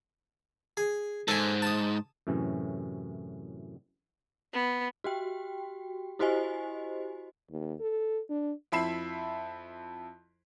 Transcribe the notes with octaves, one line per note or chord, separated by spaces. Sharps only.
G#4
G#2 A4 G#5
A5 D#6
F#2 A2 C3 E3 C#4
B3
F#4 G4 G5
E4 F#4 G4 C5 D#5 G#5
D#2
A4
D4
F2 E4 E5 B5 C7 E7